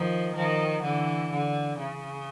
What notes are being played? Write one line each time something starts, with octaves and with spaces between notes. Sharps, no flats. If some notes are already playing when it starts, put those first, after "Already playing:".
Already playing: D#3 F3
D#3 F3
D3 E3
D3
C#3